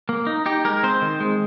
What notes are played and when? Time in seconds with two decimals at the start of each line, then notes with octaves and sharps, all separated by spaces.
0.09 A#3
0.27 D#4
0.46 D#4 G4
0.65 G#3 A#4
0.83 C4 C5
1.02 D#3
1.20 G#3